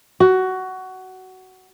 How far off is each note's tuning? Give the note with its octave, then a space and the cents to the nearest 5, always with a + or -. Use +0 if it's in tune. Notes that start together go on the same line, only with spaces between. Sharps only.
F#4 +15